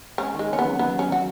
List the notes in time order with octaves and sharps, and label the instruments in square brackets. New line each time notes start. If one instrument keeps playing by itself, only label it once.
[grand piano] G#3 [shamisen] C#4
[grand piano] D#3
[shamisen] G#3
[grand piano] C#3 [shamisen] C#4
[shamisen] B3
[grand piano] F#3
[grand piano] F#3 [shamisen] B3
[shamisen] C#4
[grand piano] F#3 [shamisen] F#4